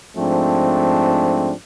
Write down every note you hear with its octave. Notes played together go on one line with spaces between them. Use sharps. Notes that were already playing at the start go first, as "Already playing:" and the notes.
G#2 F3 A3 C4 D4